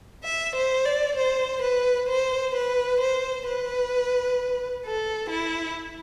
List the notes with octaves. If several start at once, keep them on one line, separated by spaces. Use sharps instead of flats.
E5
C5
D5
C5
B4
C5
B4
C5
B4
A4
E4